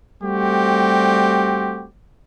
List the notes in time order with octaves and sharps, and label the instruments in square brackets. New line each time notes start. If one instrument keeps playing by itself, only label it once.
[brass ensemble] G3 A3 C4 F#4 G4